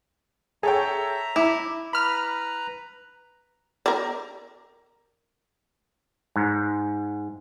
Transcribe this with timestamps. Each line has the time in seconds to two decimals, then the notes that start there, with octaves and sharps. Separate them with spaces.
0.63 G#4 A4 C#5 E5 G5 A#5
1.36 E4 D6
1.93 B4 A#5 B5 F6
3.86 A#4 D5
6.36 G#2